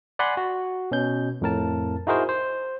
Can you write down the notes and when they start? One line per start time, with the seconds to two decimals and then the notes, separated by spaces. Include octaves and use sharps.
0.19 D5 F#5 G#5 B5 C6
0.37 F#4
0.91 B2 C#4 G6
1.41 F2 A2 A#4 A5
2.07 D#4 E4 F#4 G#4 A#4 C5
2.29 C5